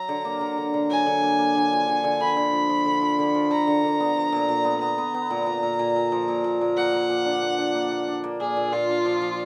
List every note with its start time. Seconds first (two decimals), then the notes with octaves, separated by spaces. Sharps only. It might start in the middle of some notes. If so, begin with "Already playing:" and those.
Already playing: F#3 A#5
0.09 D3
0.25 A#3
0.41 D3
0.58 D3
0.74 D3
0.90 F#3 G#5
1.06 D3
1.23 A#3
1.38 A#3
1.55 D3
1.72 F3
1.87 D3
2.04 D3
2.21 D3 B5
2.37 D3
2.53 F3
2.69 F3
2.86 D3
3.02 F3
3.19 D3
3.34 F3
3.51 D3 A#5
3.67 D3
3.84 D3
4.00 B3
4.17 F3
4.32 A#2
4.49 A#2
4.64 B3
4.81 B3 A#5
4.98 B3
5.14 B3
5.30 A#2
5.46 A#2
5.63 A#2
5.79 A#2
5.96 A#2
6.12 F3
6.28 A#2
6.44 A#2
6.61 A#2
6.77 A#3 F#5
6.93 A#3
7.10 A#2
7.25 D4
7.42 A#3
7.59 D4
7.75 A#3
7.91 A#3
8.08 D4
8.24 A#3
8.40 A#2 G#4
8.57 A#2
8.73 A#2 F4
8.89 D4
9.05 F3
9.22 F3